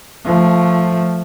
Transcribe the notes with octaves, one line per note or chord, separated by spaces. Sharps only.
F3 A3